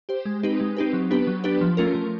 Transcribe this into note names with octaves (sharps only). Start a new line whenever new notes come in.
G4 C5
G#3
C4 D#4 G4 B4
G#3
C4 D#4 G4 B4
F#3
B3 D4 G4 B4
F#3
B3 D4 G4 B4
F3
A3 C#4 F4 A#4
F3